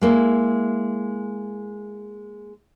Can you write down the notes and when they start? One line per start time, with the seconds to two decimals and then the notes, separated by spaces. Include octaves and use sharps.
0.01 G#3 A#3 E4